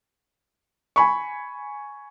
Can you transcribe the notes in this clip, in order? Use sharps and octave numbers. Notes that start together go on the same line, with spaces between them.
G#5 B5 C#6